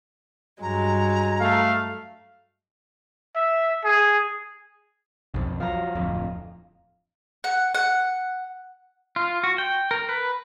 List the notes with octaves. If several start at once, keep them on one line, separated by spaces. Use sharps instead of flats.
G2 F#3 G#3 A#5
A3 F5
E5
G#4
B1 F2
F3 F#3 F5 A#5
D1 F2
F#5
F#5
F4
F#4
G5
A#4
B4